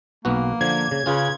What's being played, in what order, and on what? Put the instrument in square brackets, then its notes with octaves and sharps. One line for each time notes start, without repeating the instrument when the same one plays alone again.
[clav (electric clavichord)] B1 B3 F#4 [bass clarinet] A#3
[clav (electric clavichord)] D3 F3 [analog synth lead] G#6
[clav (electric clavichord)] C#3
[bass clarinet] C#3 [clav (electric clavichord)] C#4 F4 B4